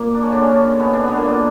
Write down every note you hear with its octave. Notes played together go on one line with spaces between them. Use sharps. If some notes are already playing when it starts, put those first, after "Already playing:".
Already playing: A#2 A#3
D4
C#3 C#4
D3 D4
C#3 C#4
C#3 C#4
B2 B3
D3 D4
B2 B3
A#2 A#3
A#2 A#3